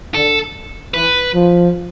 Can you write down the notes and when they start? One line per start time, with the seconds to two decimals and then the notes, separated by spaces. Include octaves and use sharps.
0.14 D3 A4
0.94 E3 B4
1.34 F3